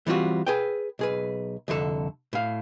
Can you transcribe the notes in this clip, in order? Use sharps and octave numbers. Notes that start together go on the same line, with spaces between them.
E3 G3 C4 F4 F#4
G#4 B4 G5
B1 G#4 B4
C2 F2 D3 A4
A2 F5